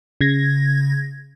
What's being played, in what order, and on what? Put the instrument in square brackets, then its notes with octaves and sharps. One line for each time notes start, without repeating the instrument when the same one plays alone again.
[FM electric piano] C#3 G#6 A#6